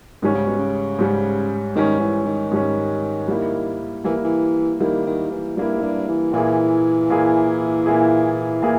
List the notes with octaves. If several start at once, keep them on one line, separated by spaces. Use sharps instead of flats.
G#2 D#3 G3 C#4
C#3
B2
C#3
G#2 G3 C#4
G#2 D#3 G3 C#4
E3
D#3
G#2 G3 C#4
G3 A#3 E4
E3 G3 A#3 E4
E3
D#3 G3 A#3 E4
D#3
E3
G2 G3 A#3 E4
G#2
G2
E3
A#2 E3 A#3 E4 G#4
A#2 A#3 E4 G#4
A#2 A#3 E4 G#4
A#2 A#3 E4 G#4